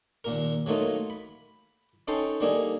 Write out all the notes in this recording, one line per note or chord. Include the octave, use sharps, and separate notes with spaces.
D#2 A#2 A#4
F#3 A3 A#3 D#4 F4
B5
C#4 D#4 A4 G5 A5 C6
G3 A#3 D4 D#4 G#4 A4